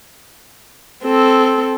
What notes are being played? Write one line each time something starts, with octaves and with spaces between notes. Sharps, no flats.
C4 A4